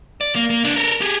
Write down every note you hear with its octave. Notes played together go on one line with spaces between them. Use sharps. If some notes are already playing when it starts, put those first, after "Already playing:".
D5
A#3
A#3
C#2 D4
A4 A#4
G4 G#4